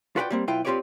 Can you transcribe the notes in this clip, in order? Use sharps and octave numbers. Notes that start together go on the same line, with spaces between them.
F4 F#4 B4 D5 F#5 G5
G3 A#3 C4
B1 E4 F4 B4 G5
C4 F4 G4 B4 C#5 D5